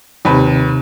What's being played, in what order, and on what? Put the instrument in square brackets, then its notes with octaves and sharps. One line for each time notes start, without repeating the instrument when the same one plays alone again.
[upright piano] D#2 B4 [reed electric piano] C3 D#4